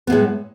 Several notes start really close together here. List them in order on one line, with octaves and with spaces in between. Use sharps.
B3 A2 G#3